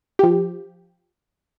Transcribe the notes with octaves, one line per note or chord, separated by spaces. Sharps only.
F3 G4